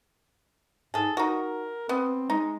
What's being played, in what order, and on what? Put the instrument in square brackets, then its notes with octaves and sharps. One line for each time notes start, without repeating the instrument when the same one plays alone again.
[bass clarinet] G#2 [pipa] G#4 A4
[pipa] D#4 F#4 [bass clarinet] A#4
[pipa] B3 [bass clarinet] C4
[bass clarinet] G#3 [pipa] D#4